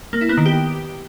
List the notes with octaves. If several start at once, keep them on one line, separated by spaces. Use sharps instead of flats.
A#3
E4
B3
D#3
G4